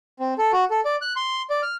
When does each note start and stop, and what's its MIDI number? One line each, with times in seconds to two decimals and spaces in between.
0.20 0.34 60
0.38 0.52 69
0.52 0.65 66
0.70 0.80 69
0.85 0.96 74
1.02 1.13 90
1.16 1.42 84
1.50 1.61 74
1.62 1.76 89